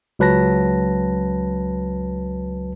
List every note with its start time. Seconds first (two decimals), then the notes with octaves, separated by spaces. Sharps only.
0.19 C#2 F#3 B4 A5 A#6